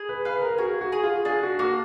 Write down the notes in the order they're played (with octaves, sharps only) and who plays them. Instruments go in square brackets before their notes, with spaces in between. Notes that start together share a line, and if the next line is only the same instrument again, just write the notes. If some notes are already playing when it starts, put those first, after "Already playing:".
Already playing: [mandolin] G#4
[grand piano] B4
[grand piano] B4 [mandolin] F5
[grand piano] A#4
[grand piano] F#4 [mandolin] G#4
[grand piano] F#4
[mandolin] G#4
[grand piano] F4
[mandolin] D4 [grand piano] G#4
[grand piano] F#4
[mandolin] A#3 [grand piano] F#4